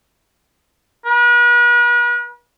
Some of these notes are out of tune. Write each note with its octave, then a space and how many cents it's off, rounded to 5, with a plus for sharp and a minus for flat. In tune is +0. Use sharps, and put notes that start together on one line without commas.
B4 -40